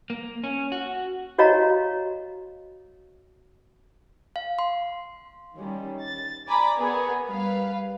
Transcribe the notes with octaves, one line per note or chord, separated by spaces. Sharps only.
A#3
C#4
F#4
F#4 C#5 D#5 F5 A#5
F5
C6
D#3 G3 C#4
A6
D5 G#5 A#5 B5 D6
B3 G#4 A#4
G3 B4 F5